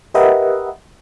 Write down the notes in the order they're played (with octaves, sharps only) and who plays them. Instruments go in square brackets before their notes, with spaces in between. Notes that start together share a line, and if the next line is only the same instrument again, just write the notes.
[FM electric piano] G4 A#4 B4 D#5 E5 F#5